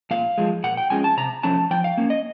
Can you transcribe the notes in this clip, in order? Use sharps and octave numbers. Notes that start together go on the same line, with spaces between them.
A#2 F5
F3 G#3
A#2 F#5
G5
F3 G#3 C#4 G#5
A5
C3 A#5
F3 A3 C#4 A5
F3 G5
F5
A#3 C#4
D#5